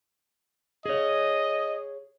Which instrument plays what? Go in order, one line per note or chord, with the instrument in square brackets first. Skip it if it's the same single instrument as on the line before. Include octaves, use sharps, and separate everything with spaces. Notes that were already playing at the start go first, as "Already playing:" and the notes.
[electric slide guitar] G#4 C#5 [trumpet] D#5